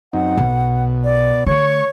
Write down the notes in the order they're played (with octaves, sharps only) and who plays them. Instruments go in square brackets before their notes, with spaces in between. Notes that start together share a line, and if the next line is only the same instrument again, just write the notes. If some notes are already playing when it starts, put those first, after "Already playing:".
[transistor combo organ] F#2 C4 D#4 [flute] F#5
[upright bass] B1 [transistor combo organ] B2
[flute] D5
[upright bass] D3 A3 [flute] C#5 [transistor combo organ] C#6